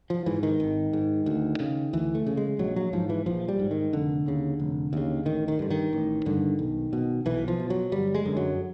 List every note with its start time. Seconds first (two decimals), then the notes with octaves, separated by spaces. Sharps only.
0.10 F3
0.26 G#2 E3
0.43 D#3
0.60 G#1
0.93 G#2
1.26 D2
1.60 C#3
1.93 D2 E3
2.15 A3
2.27 C#3
2.37 G#3
2.59 A#1 F#3
2.76 F#3
2.93 G#2 F3
3.10 E3
3.26 A#1 F3
3.48 G3
3.59 G#2
3.71 D#3
3.93 F1 D3
4.26 D#2 C#3
4.60 F1
4.93 D#2 C#3
5.26 A1 D#3
5.48 D#3
5.59 G2 D3
5.70 D#3
5.93 A1
6.26 G2 D3
6.59 B1
6.93 B2
7.26 B1 E3
7.48 F3
7.60 B2
7.70 F#3
7.92 G1 G3
8.15 G#3
8.25 F#2 D3
8.37 F#3